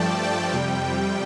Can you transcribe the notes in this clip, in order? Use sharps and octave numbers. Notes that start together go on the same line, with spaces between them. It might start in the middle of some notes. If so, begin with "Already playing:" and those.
Already playing: G2 F3 A3 D5 G5 A5
G5
F2 C3 G3